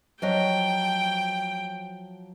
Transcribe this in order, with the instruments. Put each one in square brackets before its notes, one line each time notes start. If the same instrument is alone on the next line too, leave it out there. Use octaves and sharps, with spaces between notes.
[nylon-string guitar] F3 F#3 D#5 [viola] G5